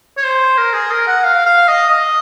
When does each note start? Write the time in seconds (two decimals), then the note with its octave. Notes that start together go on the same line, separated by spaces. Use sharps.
0.17 C#5
0.23 C5
0.58 A#4
0.73 G#4
0.91 A#4
1.07 F#5
1.24 F5
1.46 F5
1.68 D#5
1.90 D#5